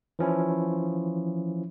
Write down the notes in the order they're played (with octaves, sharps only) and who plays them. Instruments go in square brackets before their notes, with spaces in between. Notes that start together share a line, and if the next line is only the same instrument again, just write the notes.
[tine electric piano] E3 F3 C#4 E4